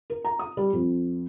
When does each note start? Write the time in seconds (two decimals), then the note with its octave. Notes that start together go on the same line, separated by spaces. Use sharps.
0.10 A#4
0.25 A#5
0.39 D#6
0.57 G3
0.73 F2